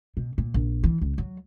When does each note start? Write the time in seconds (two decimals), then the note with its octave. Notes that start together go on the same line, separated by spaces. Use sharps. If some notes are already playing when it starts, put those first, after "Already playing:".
0.17 B2
0.38 A#2
0.54 A#1
0.84 E3
1.01 C#2
1.18 F#3